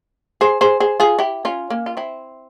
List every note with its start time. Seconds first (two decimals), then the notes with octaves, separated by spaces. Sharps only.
0.41 G#4 C5
0.61 G#4 C5
0.80 G#4 C5
1.00 F4 G#4
1.19 E4 G4
1.45 C#4 F4
1.70 A#3 C#4
1.86 F4
1.97 C4 E4